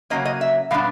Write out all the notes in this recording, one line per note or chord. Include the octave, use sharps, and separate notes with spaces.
C#3 F#3 A#3 C#4 D#5
D#5
E5
B2 G3 B3 D4 F5